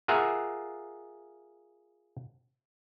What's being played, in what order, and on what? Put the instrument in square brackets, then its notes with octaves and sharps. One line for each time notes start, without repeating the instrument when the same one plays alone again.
[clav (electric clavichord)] F4 G#4 A#4 E5 F#5